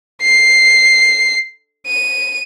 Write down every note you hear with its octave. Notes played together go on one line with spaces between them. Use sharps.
C7
D#7